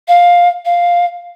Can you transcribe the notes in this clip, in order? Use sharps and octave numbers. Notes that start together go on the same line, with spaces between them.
F5
F5